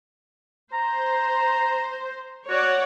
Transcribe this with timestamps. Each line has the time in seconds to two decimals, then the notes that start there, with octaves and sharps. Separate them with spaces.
0.73 C5 A#5
2.50 F#4 C#5 D5 F#5